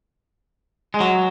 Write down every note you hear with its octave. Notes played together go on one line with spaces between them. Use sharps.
G#3
F#3